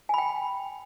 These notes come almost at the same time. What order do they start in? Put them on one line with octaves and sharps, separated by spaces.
G#5 B5 G5